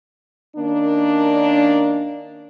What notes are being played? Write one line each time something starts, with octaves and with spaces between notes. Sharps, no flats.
D#3 A#3 C#4 D4